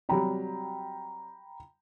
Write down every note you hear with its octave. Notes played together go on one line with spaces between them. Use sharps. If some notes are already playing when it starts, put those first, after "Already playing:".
C3 F#3 G3 G5 A#5 B5